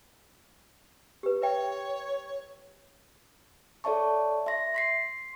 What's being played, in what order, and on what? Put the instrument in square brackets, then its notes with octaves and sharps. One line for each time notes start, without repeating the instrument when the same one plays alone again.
[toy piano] G4 B4
[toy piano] B4 E5 G5 [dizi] C#5
[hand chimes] A4 C#5 D5 E5 A5 C#6
E5 C6 A#6
C6 B6 C7